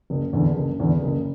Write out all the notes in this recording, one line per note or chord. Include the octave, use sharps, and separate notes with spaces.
F#1
E2 D3
F#1
E2 D3
F#1